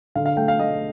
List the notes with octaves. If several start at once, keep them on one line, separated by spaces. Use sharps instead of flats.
D3 F5
F5
A3 G5
F5
A3 D#5